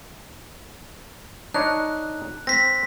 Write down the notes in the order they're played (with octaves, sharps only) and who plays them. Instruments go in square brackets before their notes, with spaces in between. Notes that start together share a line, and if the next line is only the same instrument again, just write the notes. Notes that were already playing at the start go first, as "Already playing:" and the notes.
[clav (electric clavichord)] D4 D#4 C#5 [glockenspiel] F#6
[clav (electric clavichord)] C4 [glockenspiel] A#6 B6